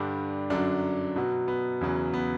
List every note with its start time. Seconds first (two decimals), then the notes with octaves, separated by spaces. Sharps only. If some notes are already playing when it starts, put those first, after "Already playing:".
Already playing: G2 D3 G3 D4
0.50 F#2 D3 F#3 D4
1.16 B2 F#3
1.48 B3
1.81 E2 C#3 F#3
2.14 B3